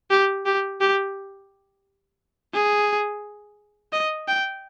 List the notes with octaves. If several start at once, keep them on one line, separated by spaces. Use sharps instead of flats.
G4
G4
G4
G#4
D#5
G5